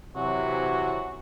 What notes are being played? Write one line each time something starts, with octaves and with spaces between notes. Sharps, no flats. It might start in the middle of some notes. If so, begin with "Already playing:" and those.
C3 E3 F#3 F#4